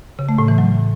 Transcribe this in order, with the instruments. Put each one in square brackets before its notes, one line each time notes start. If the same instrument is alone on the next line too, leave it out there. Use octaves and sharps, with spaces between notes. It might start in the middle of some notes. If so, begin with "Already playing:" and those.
[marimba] C#3
A3
A2
E3
F#3